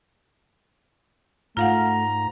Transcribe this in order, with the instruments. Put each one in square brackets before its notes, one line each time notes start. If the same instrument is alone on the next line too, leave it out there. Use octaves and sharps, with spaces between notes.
[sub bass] G#2 [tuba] A3 [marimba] F4 F5 F#5 [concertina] A#5